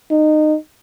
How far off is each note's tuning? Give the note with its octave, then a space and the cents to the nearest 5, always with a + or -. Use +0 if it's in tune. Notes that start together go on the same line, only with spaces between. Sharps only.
D#4 -20